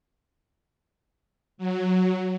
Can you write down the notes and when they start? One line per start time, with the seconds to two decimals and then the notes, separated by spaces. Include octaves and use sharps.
1.58 F#3